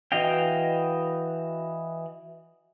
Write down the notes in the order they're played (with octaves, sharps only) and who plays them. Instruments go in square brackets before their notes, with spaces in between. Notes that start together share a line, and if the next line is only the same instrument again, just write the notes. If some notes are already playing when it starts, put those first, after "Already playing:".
[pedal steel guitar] E3 F#4 D#5 F5 G5